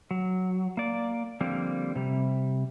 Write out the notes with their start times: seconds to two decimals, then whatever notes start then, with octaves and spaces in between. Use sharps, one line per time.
0.11 F#3
0.77 A#3 D5
1.40 D3 F3 G3 A#3 C4
1.95 C3 G3